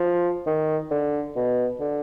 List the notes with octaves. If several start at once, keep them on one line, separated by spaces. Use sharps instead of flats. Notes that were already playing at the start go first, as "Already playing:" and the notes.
Already playing: F3
D#3
D3
B2
D3